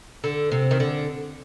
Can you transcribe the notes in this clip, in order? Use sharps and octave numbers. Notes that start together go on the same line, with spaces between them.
D3
C3
D#3
D3